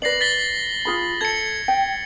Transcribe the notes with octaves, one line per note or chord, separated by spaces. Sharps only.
B4 D5 A#6 C7 F#7
A6 B6 G7
F4 G#4 B5
A4 G#6 C#7
G5